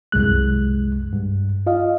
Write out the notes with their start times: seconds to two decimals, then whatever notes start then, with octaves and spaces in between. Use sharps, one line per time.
0.12 C2 F#2 G#3 F#6
1.13 G2
1.67 F4 D#5 F5